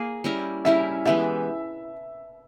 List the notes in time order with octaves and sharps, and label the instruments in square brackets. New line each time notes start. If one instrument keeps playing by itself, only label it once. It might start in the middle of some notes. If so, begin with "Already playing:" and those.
Already playing: [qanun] A#3 G#4
G3 C#4 E4 A#4
[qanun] G3 C#4 E4 A#4 [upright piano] E5
[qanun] E3 G#3 B3 G4 [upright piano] E5